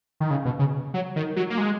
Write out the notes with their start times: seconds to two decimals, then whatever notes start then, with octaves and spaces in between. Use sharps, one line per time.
0.20 D#3
0.31 C#3
0.45 B2
0.59 C#3
0.94 F#3
1.16 D#3
1.36 F#3
1.50 A#3
1.58 G#3